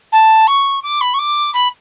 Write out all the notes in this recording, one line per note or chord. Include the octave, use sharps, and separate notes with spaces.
A5
C#6
D6
B5
C#6
D6
B5